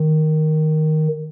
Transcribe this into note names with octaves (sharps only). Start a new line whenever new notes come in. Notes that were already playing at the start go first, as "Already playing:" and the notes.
Already playing: D#3